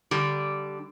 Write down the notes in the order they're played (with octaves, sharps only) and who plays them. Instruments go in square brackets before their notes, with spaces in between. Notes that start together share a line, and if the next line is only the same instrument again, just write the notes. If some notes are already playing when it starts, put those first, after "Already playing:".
[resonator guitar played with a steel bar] D3 G3